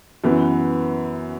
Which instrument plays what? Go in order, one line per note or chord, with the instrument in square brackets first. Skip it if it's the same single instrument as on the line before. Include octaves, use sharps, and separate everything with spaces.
[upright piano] F#2 E3 B3